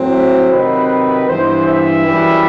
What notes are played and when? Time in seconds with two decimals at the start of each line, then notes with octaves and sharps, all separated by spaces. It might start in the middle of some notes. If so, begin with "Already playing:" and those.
Already playing: A2 F#3 C4
0.12 E5
0.51 C3 D#3 F#3 C4 B4
1.27 G2 E3 B3 C5
1.66 E5
2.05 F#2 E3 G3